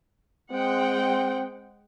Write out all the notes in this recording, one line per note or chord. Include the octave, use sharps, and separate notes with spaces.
G#3 C4 F#5 G5